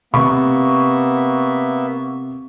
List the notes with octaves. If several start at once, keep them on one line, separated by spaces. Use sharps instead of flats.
C3 A#3 B3 E5 C#6